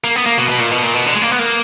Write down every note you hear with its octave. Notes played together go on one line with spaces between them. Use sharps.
A#3
B3
A#3
B2
B2
A#2
B2
A#2
B2
D3
G#3
A#3
B3
A#3